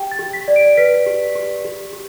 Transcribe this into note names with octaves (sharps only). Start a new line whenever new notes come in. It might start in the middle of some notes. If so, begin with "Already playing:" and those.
Already playing: G4 G5
A6
G4
B6
D5
D7
B4 B6
G4
G4
G4
G4